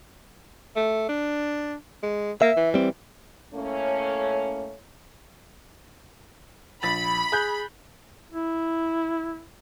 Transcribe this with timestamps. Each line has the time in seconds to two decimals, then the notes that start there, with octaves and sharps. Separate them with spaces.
0.76 A3
1.09 D4
2.03 G#3
2.42 A#3 E5
2.57 E3
2.74 G3 C4
3.55 A2 A3 A#3 C#4
6.83 A#1 B5 A6
7.32 G#4 F#6 G6
8.32 E4